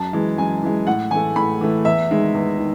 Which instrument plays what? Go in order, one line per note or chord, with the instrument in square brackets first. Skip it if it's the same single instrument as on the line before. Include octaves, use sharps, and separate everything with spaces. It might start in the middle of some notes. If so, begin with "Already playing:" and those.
Already playing: [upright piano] F#2 A5
E3 G#3
F#2 G#5
E3 G#3
A2 F#5
E3 A3 G#5
A2 B5
E3 A3
E2 E5
D#3 G#3
E2
D#3